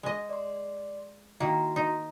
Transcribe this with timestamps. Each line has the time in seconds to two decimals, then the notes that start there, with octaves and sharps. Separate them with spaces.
0.03 G#3 D#5
0.29 D5 C6
1.40 D#3 A#3 E4 F#4 A#5
1.76 D#4